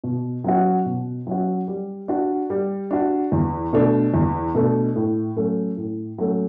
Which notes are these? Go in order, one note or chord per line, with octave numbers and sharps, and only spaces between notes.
B2
F#3 C#4 F#4
B2
F#3 C#4 F#4
G3
D4 F#4
G3
D4 F#4
E2
B2 A3 D4
E2
B2 A3 D4
A2
F#3 A3 C#4
A2
F#3 A3 C#4